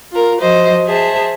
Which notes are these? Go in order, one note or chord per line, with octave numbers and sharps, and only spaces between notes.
F4 A#4
F3 F#4 C5 D#5
G#4 C5 E5 A5